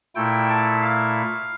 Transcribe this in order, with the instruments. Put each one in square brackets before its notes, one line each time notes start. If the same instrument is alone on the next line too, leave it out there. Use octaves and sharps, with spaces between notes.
[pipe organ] A#2 A3 E4 G5
A5
F5